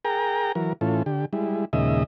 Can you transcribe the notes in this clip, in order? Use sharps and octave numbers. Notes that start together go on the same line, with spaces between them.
G#4 A#4 G5 A#5
E3 F#3 A#4
A2 E3 C#4 F4 A4
D3 G4
G3 G#3 E4
D#2 A#2 C#3 G#3 D#5 E5